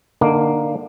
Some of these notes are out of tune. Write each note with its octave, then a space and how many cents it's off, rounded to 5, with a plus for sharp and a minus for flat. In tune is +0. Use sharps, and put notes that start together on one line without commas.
D3 +20 A#3 +0 D#4 +0